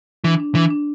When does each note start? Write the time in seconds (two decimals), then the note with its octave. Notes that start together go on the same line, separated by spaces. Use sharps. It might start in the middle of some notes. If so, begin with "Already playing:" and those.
0.24 E3 D4
0.40 D4
0.55 E3 D4
0.70 D4